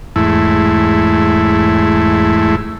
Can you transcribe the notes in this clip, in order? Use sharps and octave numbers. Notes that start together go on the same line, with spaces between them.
E2 G#2 A3 E4